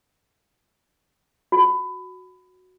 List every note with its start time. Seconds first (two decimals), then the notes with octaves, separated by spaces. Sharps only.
1.52 F#4